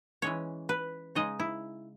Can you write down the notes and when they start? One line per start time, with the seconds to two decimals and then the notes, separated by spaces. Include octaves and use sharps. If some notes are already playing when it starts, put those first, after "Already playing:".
0.22 E3 G#3 C#4 C#5
0.69 B4
1.15 C#3 G#3 D#4 D#5
1.40 E4